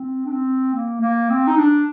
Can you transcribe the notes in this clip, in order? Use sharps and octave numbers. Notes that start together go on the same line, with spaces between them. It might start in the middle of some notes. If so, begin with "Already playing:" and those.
Already playing: C4
D4
C4
A#3
A#3
C4
D#4
D4